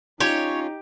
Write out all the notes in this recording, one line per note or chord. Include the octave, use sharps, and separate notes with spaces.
C#4 D#4 F4 G4 C#5